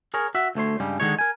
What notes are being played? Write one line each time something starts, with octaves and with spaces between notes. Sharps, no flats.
G#4 A#4 C#5 A#5
F#4 E5
D2 A3 C#5 C6
G2 C#3 G3 G#3
D3 D#3 G#3 D#4 C#5
A#4 G#5